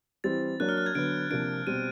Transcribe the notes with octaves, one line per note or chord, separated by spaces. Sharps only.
E3 G3 C4 A6
F#3 A#3 D4 F#6
F6
F#6
G#6
D3 F#3 B3 D7
C3 F3 A#3 D4 D7
B2 G3 C4 D#7